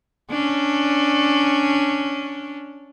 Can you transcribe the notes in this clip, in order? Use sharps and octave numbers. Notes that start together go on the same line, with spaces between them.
C#4 D4